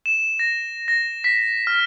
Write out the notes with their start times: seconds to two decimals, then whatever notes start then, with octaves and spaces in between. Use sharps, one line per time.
0.06 E7
0.39 A#6
0.88 A#6
1.24 B6
1.67 F6